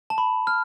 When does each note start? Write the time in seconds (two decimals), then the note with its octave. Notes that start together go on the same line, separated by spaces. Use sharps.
0.10 A5
0.18 B5
0.47 F6